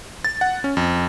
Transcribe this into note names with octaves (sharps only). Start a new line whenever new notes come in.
A6
F#5
C#4
F2